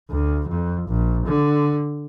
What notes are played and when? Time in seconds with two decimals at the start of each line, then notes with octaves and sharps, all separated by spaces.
0.10 D2
0.48 F2
0.88 A#1
1.26 D3